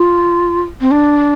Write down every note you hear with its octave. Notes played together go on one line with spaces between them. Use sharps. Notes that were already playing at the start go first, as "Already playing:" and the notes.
Already playing: F4
C4
D4